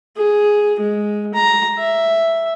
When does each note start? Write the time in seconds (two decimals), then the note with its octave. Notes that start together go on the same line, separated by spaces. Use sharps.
0.17 G#4
0.80 G#3
1.34 A#5
1.79 E5